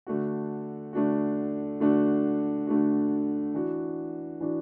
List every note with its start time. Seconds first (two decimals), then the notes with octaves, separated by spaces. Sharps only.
0.07 D3 A3 D4 F#4
0.93 D3 A3 D4 F#4
1.80 D3 A3 D4 F#4
2.67 D3 A3 D4 F#4
3.54 E3 D4 F#4
4.41 E3 D4 F#4